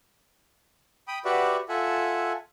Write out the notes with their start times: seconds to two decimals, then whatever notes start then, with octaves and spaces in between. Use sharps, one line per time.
1.08 G5 B5 D#6
1.25 F#4 G4 B4 D5 E5 F#5
1.69 F4 A4 E5 F#5 G#5